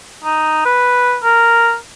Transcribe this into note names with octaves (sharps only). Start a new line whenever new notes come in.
D#4
B4
A#4